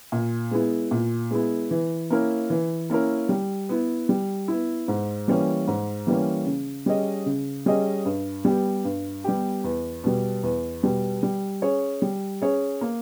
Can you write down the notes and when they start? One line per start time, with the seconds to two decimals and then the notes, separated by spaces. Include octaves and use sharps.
0.12 A#2
0.51 G#3 B3 E4
0.91 A#2
1.31 G#3 B3 E4
1.71 E3
2.10 A#3 C#4 E4 A#4
2.50 E3
2.90 A#3 C#4 E4 A#4
3.29 G3
3.69 B3 E4
4.09 G3
4.48 B3 E4
4.88 G#2
5.28 E3 G3 A#3 C#4
5.68 G#2
6.07 E3 G3 A#3 C#4
6.46 C#3
6.86 G3 C#4 G#4 D#5
7.26 C#3
7.66 G3 C#4 G#4 D#5
8.05 G2
8.45 G3 B3 G4
8.85 G2
9.24 G3 B3 G4
9.64 E2
10.04 B2 G3
10.43 E2
10.83 B2 G3
11.23 G3
11.62 C#4 G#4 C#5
12.02 G3
12.42 C#4 G#4 C#5
12.81 A#3